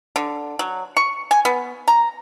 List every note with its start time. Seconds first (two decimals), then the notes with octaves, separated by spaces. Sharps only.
0.16 D3
0.59 F#3
0.97 C#6
1.31 G#5
1.45 B3
1.88 A#5